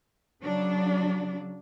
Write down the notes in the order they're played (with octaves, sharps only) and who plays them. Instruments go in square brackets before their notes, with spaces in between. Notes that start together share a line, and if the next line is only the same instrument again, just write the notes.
[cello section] C#3 F#3 D4